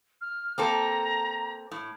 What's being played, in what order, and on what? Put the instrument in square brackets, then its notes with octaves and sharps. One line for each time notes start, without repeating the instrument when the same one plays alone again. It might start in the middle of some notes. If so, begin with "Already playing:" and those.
[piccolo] F6
[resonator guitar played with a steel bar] A#3 C4 A4 [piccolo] A#5
[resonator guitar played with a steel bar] A2